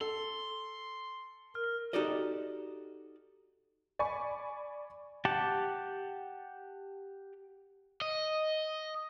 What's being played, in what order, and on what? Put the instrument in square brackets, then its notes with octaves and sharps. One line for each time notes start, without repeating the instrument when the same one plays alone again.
[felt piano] A4 [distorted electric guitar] C6
[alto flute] A#4 [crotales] F6
[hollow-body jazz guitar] D#4 F#4 G4 A4 D5 D#5
[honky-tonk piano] D5 G#5 B5 C#6
[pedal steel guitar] G4 F#5 G5 A5 D6
[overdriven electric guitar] D#5